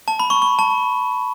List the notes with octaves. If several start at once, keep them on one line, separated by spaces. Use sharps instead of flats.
A5
B5
C#6
C#6
A5